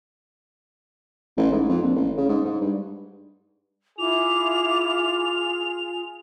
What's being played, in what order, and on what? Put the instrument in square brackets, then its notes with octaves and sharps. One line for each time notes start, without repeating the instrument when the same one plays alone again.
[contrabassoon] A1
G#2
F2
A#1
A1
C#3
G#2
G#2
G2
[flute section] E4 D6 [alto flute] F4 [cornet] G#4 [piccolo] F7